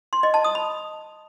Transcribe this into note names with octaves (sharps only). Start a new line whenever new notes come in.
C6
D#5
A5
D#6
B5